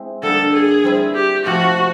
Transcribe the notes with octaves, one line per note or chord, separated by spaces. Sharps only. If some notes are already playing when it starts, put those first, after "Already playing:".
Already playing: G#3 C4 E4
D3 G3 A#3 D#4 A4
G#4
G3 C4 E4
G4
C3 F3 A3 F#4